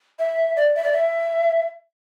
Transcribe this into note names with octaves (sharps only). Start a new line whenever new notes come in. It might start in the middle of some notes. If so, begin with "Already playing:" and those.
E5
D5
E5
D5
E5